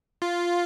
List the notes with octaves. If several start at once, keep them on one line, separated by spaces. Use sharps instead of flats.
F4